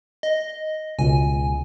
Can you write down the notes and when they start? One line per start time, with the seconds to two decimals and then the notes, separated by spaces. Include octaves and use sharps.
0.23 D#5
0.99 C#2 B2 G#5